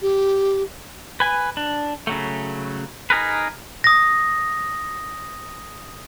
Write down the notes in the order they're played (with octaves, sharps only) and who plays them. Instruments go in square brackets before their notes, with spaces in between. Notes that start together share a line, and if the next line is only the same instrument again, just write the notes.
[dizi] G4
[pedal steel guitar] B4 G#5
D4
C#3 F#3 A3
D#4 G#4 A#4 B4
[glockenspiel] D#6 A#6